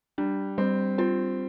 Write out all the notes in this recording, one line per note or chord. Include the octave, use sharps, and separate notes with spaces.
G3 D4
G3 C4
C4 F4